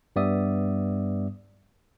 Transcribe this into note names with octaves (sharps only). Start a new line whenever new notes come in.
G2 G3 B3 D5 E5 D#6